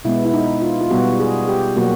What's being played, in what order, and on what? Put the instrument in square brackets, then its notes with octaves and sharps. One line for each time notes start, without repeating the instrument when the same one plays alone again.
[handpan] B2 G#3 B3 E4
E4
D#4
F4
F4
B2 G3 B3 F#4
G#4
G4
B2 F#3 A#3 F#4